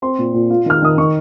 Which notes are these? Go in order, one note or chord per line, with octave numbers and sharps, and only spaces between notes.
C4 C6
A#2
A#2
F4
D#3 F6
D#3 D#6
D#3 C#6